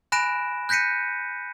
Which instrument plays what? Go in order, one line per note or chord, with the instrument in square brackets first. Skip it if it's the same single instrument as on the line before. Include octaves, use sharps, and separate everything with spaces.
[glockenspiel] G#5 B5 F#6 A#6 D7 E7
F#6 G6 A#6 B6 C#7 D#7